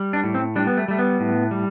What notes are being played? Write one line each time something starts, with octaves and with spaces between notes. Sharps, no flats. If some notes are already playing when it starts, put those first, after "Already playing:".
Already playing: G3
D4
A2
C4
G3 D4
B3
A3
G3 A3
B3
A2
G3